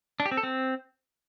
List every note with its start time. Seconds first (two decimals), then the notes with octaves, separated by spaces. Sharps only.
0.20 D4
0.26 G4
0.31 C4
0.37 A4
0.43 C4